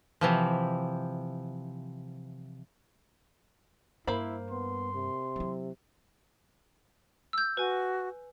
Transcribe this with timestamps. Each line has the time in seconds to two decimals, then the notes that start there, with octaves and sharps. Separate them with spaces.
0.21 C3 E3 F3
4.07 G2 A#3 E4 C5 B5
4.51 B3 C6
4.94 C3
5.36 F#3 E4
7.33 E6 G6
7.57 F#4 B4 G#5